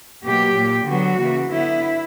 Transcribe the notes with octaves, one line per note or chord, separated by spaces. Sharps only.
B2 F#3 A#3 G4
A#2 A#3
D3 F#3 B3 F#4
C#3 E3 A#3
D3 F#3 B3 E4